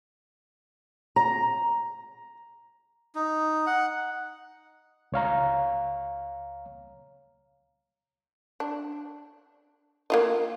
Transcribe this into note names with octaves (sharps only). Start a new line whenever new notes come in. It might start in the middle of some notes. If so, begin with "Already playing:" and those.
A#5
D#4
F#5
C#2 C#5 F5 A#5
D4
A#3 F4 D#5